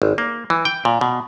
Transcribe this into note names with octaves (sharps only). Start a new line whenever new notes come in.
G#1
A#3
E3
G5
A#2
B2